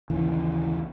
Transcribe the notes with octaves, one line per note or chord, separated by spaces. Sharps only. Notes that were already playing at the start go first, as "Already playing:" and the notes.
A#1 D#2 C#3 E3